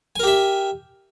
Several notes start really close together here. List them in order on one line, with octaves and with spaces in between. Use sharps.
G#5 A#4 G4 E5